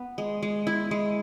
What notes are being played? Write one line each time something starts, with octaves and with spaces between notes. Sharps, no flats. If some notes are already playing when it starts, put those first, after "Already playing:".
Already playing: B3 B4
G#3
G#3
E4
G#3